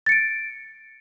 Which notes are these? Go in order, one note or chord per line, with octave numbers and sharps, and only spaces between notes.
A6 C#7 D7